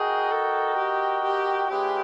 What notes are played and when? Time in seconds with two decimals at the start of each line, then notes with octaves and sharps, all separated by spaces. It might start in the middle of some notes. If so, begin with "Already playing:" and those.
Already playing: F#4 G#4 A#4 D#5 G5
0.31 A4
0.77 G4
1.24 G4
1.69 G#3 C#4 F4 G4 G#4 B4